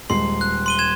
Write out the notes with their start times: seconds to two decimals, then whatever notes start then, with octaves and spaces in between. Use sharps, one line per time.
0.10 D#1 G#3 C6 C7
0.41 F#6
0.66 C6 D#7 G7
0.79 G#6 E7